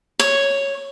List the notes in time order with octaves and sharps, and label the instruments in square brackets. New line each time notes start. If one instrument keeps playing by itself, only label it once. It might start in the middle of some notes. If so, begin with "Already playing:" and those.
[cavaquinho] C#5